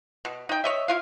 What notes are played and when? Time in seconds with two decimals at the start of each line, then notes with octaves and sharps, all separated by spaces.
0.25 B2
0.49 D#4 G5
0.64 C#5 D#5 E5
0.88 E4 F4 F5